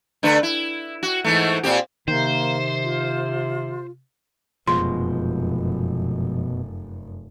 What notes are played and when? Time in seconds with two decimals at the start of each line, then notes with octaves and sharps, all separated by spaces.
0.23 D3 A3 B4
0.43 E4
1.03 F#4
1.24 G#2 E3 A3
1.63 A#2 C4 G4
2.08 C3 D#3 A#3 C5
2.84 F4
4.67 F1 F#2 B2 F3 G#3 C6